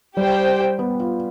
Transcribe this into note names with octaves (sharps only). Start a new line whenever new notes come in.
G3 G4 C5 G5
B3
F4